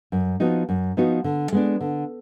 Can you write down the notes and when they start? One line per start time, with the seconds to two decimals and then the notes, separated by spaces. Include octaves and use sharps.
0.12 F#2
0.40 F3 B3 D#4 F#4
0.69 F#2
0.97 F3 B3 D#4 F#4
1.24 D3
1.52 G#3 B3 D4
1.81 D3